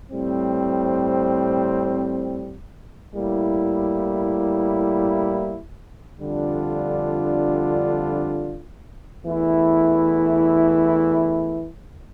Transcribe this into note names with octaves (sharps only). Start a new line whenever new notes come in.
A2 G3 C4
A2 G3 A#3 E4
F2 D3 G3 D4 F4
E2 E3 A3 E4